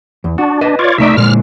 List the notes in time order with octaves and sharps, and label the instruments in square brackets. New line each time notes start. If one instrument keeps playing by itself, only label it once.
[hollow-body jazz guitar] E2
[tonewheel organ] D4 [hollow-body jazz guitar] F#4
[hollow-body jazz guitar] B4 D#5
[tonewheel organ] F4 C#5 D5
[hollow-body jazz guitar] C2 A3 D5 [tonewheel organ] D#4 E5
[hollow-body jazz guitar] A#2 D3 G#3 [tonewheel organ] F6